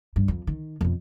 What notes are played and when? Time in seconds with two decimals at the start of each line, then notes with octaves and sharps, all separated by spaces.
0.16 G2
0.28 F2
0.47 D#3
0.81 F2 B2